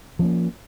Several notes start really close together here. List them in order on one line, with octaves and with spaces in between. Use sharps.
F3 C#4 A#3